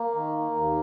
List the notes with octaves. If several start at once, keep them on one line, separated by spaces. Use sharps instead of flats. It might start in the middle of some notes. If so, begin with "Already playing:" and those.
Already playing: A#3
D#3
D#2